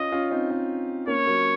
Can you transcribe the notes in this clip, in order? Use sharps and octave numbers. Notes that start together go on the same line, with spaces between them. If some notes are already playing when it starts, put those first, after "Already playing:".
Already playing: C#4 F4 D#5
C#4 F4
C4 D#4
C4 D#4
A#3 C#4 C#5
F#3 A#3